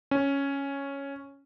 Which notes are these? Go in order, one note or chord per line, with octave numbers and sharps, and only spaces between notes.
C#4